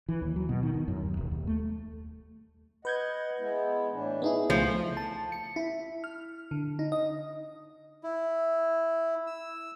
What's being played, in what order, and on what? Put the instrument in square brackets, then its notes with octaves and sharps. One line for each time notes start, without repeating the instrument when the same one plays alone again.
[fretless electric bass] E3
D#2
F#3
B2
D#3
D#3
F#2
D#2
E1
D#2
A3
[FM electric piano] B4 G6 G#6 [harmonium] D#5 F#5
[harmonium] G#3 B3 E4
A2 E3 D4
[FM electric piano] B3 D#4 E4 [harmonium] G#4
[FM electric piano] C#2 A3 [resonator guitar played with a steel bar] F3
[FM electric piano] A5
C#7
E4
F6
D3
D#4
D#5
[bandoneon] E4
E6